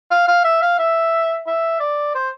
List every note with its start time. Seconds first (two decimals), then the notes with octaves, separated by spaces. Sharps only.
0.11 F5
0.28 F5
0.44 E5
0.62 F5
0.79 E5
1.47 E5
1.80 D5
2.15 C5